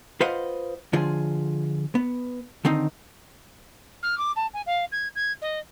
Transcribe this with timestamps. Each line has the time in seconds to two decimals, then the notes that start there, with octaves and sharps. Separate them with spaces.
0.21 F4 B4 C5 D#5 F5 F#5
0.93 D3 F3 F4 G#4
1.95 B3
2.65 D3 D#3 C4 D#4
4.03 F6
4.18 D6
4.36 A5
4.54 G#5
4.66 F5
4.92 G#6
5.16 G#6
5.42 D#5